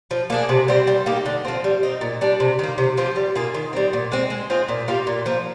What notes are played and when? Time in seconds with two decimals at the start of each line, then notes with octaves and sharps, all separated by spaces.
0.11 F3
0.30 A#3 D4 G#4
0.49 C3
0.68 G3 C4
0.87 G3
1.06 A#3 D#4 G4
1.26 D3
1.45 F3 C4
1.64 G3
1.83 C4 D#4
2.01 A#2
2.21 G3 D4
2.40 C3
2.59 D#3 A#3
2.78 C3
2.97 F3 C4 G4
3.16 G3
3.35 A#3 F4 G#4
3.54 D#3
3.73 G3 C4
3.93 A#2
4.12 G#3 C4
4.30 G#3
4.50 C4 F4 G#4
4.68 A#2
4.88 G3 A#3 F4
5.07 A#2
5.26 F3 A#3